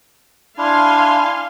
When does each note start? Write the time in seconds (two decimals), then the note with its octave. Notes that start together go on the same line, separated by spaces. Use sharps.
0.58 D4 E4 F5 G#5 C6